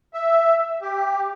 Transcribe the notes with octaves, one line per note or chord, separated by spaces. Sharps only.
E5
G4